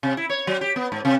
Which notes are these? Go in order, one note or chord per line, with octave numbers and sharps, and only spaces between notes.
C3
E4
C#5
F#3
G4
B3
G#2
C3